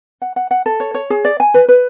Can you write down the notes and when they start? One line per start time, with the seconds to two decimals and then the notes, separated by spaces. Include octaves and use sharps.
0.22 F#5
0.36 F#5
0.51 F#5
0.66 A4
0.80 C#5
0.94 C#5
1.10 G#4
1.25 D5
1.40 G#5
1.54 B4
1.68 B4